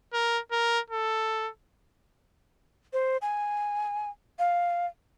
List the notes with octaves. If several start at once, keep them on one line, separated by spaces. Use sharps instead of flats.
A#4
A#4
A4
C5
G#5
F5